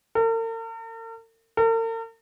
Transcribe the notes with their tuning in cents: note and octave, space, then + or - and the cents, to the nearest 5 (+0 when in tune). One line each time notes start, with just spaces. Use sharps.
A#4 -45
A#4 -45